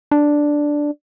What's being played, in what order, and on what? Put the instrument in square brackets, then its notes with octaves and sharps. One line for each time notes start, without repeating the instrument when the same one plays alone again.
[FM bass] D4